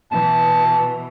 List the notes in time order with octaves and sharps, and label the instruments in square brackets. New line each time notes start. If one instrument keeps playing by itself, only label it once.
[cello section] B2 E3 [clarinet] A5